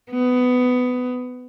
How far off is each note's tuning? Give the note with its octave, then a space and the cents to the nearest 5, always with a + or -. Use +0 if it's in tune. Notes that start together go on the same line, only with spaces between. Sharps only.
B3 +15